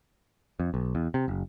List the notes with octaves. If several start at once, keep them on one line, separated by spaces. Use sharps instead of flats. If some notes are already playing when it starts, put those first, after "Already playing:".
F2
B1
E2
C3
F#1